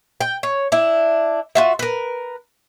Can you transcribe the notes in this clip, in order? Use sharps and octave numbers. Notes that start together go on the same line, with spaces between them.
G5
C#5
D4 E4
F4 F#4 E5
A#4 B4